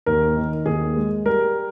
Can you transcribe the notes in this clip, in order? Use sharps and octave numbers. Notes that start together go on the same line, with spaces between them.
D#2 A#4
D#3
D#2 G#4
G#3
G3 A#4